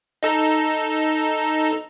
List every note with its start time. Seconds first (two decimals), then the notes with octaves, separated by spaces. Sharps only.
0.23 D#4 A4 A#5